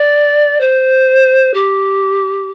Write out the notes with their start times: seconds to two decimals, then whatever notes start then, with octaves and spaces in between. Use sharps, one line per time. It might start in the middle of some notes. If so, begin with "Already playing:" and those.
Already playing: D5
0.61 C5
1.54 G4